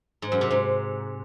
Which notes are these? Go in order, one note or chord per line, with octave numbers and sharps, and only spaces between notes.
G#2
F#2
C3
G#2